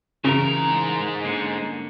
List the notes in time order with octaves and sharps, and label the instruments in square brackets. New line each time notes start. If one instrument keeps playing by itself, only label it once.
[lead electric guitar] G#2 A#5 [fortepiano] C#3 [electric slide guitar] E3 E4 A#4
[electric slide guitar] D3 A#3 C#4